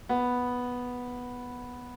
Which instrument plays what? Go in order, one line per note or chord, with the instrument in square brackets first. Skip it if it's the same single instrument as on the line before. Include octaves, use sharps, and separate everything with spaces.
[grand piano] B3